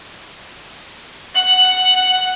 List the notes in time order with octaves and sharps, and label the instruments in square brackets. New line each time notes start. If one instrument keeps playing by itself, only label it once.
[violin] F#5 [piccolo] F#7